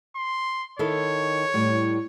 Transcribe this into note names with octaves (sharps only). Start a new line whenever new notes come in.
C6
D#3 E4 A4 C#5
A2 G3